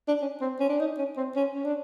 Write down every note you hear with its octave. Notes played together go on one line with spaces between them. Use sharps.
D4
C#4
C4
C#4
D4
D#4
C#4
C4
C#4
C#4
D4